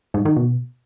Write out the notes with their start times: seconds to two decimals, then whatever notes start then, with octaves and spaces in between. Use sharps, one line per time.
0.14 G#2
0.25 D#3
0.36 B2